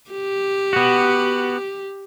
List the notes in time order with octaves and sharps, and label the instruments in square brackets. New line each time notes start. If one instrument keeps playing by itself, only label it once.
[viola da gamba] G4
[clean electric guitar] B3 F#4